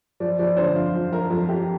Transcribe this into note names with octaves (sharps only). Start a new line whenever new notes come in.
F3 D5
F3 D5
D3 C5
F2 F4
F2
F3 A#4
F2 A4
F2 G4